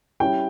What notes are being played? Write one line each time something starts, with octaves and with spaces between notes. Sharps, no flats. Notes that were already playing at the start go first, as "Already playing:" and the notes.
G3 C#4 E4 G5